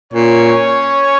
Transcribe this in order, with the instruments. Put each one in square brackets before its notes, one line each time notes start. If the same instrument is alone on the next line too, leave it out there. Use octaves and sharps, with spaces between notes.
[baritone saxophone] A#2 [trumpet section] C#4 C#5